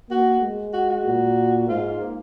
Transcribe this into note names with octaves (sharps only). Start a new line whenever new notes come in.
A#3 F#4
G#3
F#4
F#4
A#2
G#2 F4
A#3